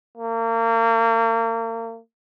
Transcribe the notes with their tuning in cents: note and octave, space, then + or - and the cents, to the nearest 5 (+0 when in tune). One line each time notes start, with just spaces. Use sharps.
A#3 -35